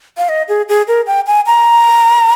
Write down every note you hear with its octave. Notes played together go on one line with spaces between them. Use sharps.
F5
D#5
G#4
G#4
A#4
G5
G#5
A#5